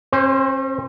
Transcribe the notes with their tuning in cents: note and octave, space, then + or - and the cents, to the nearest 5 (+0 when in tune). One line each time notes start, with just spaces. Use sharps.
C#4 -45 C5 +0